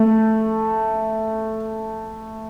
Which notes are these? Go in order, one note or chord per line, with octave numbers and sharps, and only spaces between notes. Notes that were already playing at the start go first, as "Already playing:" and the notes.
Already playing: A3